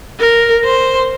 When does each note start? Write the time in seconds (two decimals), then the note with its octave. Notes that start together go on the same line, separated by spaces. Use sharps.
0.20 A#4
0.65 C5